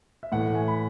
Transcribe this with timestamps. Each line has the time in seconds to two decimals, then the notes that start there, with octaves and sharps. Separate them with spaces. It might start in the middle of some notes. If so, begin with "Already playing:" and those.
0.23 E5
0.32 A2 E3 A3 F#5
0.55 G#5
0.68 B5